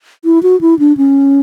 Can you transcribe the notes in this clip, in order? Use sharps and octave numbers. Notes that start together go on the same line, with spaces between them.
E4
F#4
E4
D4
C#4